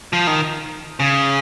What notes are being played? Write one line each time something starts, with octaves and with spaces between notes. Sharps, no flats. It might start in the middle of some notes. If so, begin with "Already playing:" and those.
F3
D#3
C#3